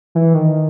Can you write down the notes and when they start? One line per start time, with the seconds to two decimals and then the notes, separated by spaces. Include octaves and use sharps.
0.15 E3
0.34 D#3